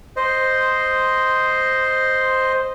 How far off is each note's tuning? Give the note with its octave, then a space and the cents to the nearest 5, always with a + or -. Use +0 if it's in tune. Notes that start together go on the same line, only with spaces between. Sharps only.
C5 +0 D#5 +0